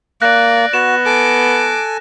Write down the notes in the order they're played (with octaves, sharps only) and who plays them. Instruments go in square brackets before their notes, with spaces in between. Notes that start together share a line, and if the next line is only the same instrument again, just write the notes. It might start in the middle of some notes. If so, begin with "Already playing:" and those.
[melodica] A#3 [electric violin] D5 [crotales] F#6 A#6
[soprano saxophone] B3 [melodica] F#4 [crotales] E7
[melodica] A4 G#5 [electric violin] D6